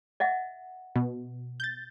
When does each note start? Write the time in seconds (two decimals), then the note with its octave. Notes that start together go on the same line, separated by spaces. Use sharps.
0.20 D#5 E5 F#5
0.96 B2
1.60 G6 A6